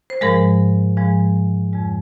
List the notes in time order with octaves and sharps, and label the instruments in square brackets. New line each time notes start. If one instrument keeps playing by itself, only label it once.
[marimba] C5
G#2 F3 G#3 A#4
G#2 F3 G#3
F2 C#3 G#3